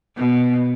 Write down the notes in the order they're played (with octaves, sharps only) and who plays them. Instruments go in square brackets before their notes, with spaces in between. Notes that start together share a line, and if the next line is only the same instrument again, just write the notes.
[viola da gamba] B2